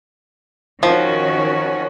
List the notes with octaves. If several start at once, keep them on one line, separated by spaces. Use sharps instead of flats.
D#3 F3 C#4 F#4